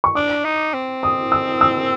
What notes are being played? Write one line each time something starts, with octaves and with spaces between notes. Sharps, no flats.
C#6
D4 D6
D#4
C4
D#6
E6
E6